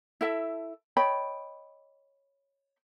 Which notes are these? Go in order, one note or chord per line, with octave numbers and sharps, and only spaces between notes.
E4 A4 E5
C#5 D#5 G5 B5